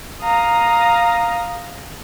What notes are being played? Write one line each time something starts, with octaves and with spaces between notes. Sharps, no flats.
F5 A#5 D#6